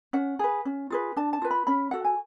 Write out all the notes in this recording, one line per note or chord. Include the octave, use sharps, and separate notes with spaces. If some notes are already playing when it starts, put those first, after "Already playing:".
C#4 F#5
G#4 B4
C#4
F4 G#4 B4
D4 A5
A5
F4 B4
B5
C#4 B5
F#4 A4 F#5
G#5